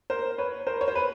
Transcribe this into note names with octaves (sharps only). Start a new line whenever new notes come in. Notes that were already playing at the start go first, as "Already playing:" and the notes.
A#4 C5
B4 C#5
A#4 C5
C#5
C5
B4